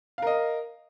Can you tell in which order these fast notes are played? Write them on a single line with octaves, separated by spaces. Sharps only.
F5 A#4 D#5